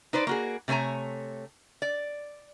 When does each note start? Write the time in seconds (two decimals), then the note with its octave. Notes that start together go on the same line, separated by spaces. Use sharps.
0.13 D#4 B4 C5 D5
0.27 A#3 F#4 G#4
0.68 C3 A3 C#5 G#5 A#5
1.82 D5